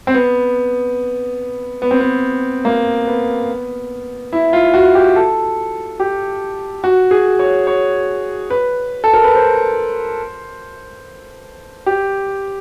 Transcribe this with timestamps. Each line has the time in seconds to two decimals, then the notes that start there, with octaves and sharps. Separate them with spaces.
0.07 C4
0.14 B3
1.82 B3
1.91 C4
2.01 B3
2.65 A#3
3.07 B3
4.33 E4
4.53 F4
4.74 F#4
4.95 G4
5.16 A4
6.00 G4
6.84 F#4
7.11 G#4
7.39 C#5
7.67 C#5
8.50 B4
9.04 A4
9.13 A#4
9.24 B4
9.35 C5
11.86 G4